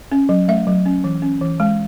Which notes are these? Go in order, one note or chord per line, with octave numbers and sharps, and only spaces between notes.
C#4
F#3
A3 E5
F#3
C#4
E3
C#4
E3
G#3